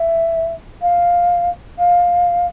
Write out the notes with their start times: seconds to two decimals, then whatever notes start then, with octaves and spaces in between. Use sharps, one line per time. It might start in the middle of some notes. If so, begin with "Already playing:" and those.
Already playing: E5
0.81 F5
1.78 F5